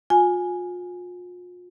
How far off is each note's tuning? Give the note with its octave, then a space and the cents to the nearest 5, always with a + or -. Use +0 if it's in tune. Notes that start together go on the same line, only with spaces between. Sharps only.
F4 +40 G#5 +0